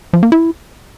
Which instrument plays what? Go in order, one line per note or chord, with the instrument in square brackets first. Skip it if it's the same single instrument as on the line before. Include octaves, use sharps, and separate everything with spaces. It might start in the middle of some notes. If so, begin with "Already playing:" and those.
[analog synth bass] F3
A#3
E4